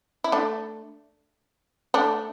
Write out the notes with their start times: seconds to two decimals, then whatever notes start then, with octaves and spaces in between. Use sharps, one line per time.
0.24 E4
0.32 A3 D4
1.94 A3 D4